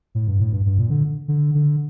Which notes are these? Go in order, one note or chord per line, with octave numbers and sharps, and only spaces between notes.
A2
G2
A2
G2
G2
A#2
D3
D3
D3